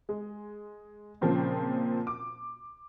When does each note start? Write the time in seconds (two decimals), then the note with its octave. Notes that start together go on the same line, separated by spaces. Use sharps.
0.09 G#3
1.21 A#2 C#3 F3 A#3 C4 C#4
2.07 D6